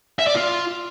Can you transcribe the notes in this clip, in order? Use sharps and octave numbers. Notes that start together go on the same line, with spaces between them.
E5
D5
F4